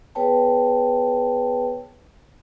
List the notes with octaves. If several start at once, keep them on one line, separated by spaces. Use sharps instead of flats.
B3 G#4 B4 C#5 G5 A5